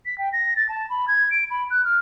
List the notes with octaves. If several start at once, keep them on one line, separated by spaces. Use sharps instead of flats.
B6
G5
A#6
A6
A5
B5
G#6
D7
B5
F#6
F6